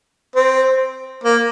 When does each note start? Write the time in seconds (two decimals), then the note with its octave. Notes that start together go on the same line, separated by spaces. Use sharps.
0.35 C4
1.23 A#3